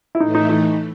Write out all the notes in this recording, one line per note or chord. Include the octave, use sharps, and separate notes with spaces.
E4
A2 E3 A3 D#4
D#4
D#4